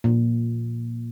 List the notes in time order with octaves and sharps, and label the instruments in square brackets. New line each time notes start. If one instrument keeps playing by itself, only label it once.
[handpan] A#2